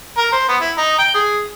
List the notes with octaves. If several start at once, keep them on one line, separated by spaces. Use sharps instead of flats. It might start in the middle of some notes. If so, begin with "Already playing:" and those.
A#4
C5
B3
E4
D#4
G5
G#4